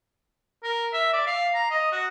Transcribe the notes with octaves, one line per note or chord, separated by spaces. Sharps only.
A#4
E5
D5
F5
A#5
D#5
F#4